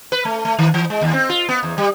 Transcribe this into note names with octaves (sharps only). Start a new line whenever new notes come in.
B4
A3
A3
D#3
E3
G#3
D#2
C4
F4
B3
E2
G3